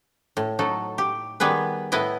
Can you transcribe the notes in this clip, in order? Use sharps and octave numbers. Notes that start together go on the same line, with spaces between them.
A2
F#3 D#4 A4
G4
D#3 G3 B3 G#4 B4
A2 B3 E4 B4 D#5